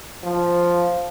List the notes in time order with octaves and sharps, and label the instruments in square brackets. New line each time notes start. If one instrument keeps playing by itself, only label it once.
[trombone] F3